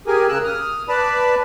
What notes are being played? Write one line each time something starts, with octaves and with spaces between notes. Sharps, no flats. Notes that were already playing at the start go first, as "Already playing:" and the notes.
G4 G#4 A#4 G#5
C#3 A#4 E6 F#6
D#6 F6
B4 D5 A5 B5